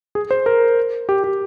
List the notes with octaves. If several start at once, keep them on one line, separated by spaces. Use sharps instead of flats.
G#4
C5
A#4
G4
G4